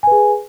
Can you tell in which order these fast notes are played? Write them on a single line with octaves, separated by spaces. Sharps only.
G#5 B4 G#4